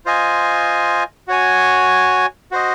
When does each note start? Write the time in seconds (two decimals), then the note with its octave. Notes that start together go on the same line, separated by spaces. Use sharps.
0.06 F4 C5 D#5 G#5
1.28 F#4 C#5 G#5
2.51 F#4 C5 D#5